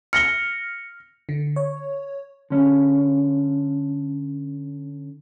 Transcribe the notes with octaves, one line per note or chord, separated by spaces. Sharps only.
F6 A#6 C#7 G7
D3
C#5
D3 C#4